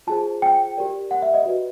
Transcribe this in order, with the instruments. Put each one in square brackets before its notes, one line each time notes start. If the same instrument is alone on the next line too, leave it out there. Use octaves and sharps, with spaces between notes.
[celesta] F4 G#4 C5 A5
G5
G4 A#4 D5
F#5
E5
D#5
F#4 B4 D5